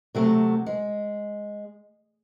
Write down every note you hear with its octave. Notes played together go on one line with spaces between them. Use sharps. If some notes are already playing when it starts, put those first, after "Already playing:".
C3 F#3 A3
G#3